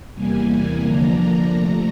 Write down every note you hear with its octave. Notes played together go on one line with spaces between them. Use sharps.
E2 C3 E3 G3 A#3 G#5
D3 F3 A#3 D4 A#5
C3 F3 A3 A#5